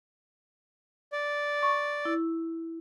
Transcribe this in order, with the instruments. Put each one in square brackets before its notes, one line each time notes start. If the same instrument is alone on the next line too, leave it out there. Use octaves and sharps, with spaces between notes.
[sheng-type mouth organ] D5
[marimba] C#6
E4